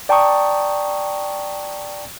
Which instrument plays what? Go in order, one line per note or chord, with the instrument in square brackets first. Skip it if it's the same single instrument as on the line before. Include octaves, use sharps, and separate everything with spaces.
[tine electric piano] D5 G5 A5 A#5 C#6 D#6